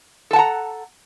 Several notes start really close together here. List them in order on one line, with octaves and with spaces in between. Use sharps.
A4 A5 F#5 A#5